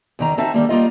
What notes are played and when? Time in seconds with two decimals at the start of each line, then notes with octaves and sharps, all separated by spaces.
0.19 E2 D#3 A#5
0.38 C4 D#4 F#4 E5 A5
0.54 D3 D#3 G3 A#3
0.69 G3 A#3 F4 D#5